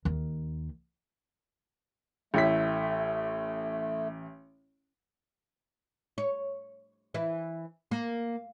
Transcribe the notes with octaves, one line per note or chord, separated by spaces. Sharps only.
D#2 D#3
A1 A3 E4 B6
C#5
E3 E4
A#3